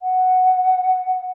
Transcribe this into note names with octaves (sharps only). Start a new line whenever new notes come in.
F#5